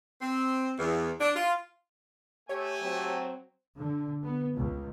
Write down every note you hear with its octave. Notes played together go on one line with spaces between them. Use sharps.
C4
E2
D4
F4
A3 G4 C#5 G#5
F#3 C4
D3
B3
C#2